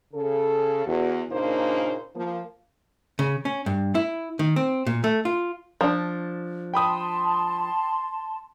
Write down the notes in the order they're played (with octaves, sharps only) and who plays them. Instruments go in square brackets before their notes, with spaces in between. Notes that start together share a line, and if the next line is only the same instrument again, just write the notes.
[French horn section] C#3 A4
E2 F#4
A#2 C#3 A#3 D4 D#4 C5
F3 A#3
[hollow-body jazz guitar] C#3
C#4
G2
E4
D#3
C4
A#2
A3
F4
[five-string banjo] F3 D4
[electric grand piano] G5 B5 D#6 [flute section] A5 C6